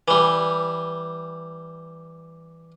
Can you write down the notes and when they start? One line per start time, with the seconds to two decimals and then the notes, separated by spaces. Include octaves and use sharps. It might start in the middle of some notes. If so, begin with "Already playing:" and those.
0.08 E3 G3